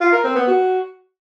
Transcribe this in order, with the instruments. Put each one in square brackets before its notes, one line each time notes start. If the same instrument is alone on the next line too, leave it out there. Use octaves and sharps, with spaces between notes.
[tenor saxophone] F4
A#4
C4
B3
F#4